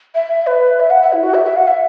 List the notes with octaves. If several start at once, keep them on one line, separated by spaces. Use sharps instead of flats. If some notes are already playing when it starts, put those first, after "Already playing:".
E5
B4
E5
F#5
E5
E4
F#4
E5
E5
F#5
E5